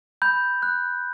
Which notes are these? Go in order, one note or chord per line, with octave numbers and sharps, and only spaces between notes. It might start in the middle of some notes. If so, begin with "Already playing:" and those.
B5 G6
F#6